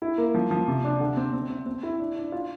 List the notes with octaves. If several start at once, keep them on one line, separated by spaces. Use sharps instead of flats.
E4
A#3
F3
F3
C3
D4
D3
C4
C4
C4
C4
E4
D4
D4
F4